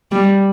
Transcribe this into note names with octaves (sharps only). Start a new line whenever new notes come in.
G3